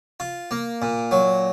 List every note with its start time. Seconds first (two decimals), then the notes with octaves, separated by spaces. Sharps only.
0.20 F4
0.51 A#3
0.82 A#2
1.11 F#3